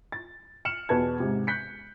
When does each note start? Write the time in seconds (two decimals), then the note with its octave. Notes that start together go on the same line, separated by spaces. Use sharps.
0.12 A6
0.65 F6 C#7 E7 F#7
0.89 E2 B2 B4 A5 G#6
1.20 G#2 C3
1.47 F#6 G6 B6 C#7